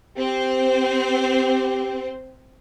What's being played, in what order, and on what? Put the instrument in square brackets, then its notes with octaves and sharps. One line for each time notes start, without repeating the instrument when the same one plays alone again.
[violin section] C4 C5 [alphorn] G4